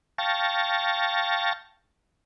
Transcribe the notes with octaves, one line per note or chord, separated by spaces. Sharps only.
F5 G5 A5 C#6 A6 A#6